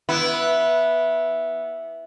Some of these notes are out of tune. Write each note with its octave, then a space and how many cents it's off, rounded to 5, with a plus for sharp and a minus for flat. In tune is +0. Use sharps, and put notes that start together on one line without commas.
B3 -10 E4 +0